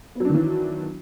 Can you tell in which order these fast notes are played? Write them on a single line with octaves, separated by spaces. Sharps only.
B3 F#3 D4 D#3 E3